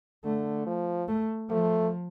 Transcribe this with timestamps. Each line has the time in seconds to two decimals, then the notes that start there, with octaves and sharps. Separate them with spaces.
0.25 D3 A3
0.67 F3
1.08 A3
1.50 F3 A3